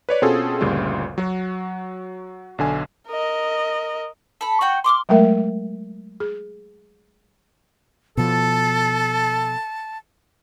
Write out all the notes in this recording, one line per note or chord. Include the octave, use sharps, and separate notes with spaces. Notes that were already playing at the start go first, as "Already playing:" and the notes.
B4 C#5 D5
B2 C4 C#4 F4 G#4 A4
G1 D2 A#2 C#3 G3 F4
F#3 F#4
B1 D3 G#5
A#4 D#5
A4 B5
F#4 F#5 G5
C6 D6 D#6 F6
F#3 G#3 A3 A#4 E5
G#4
B2 F3 A4 A5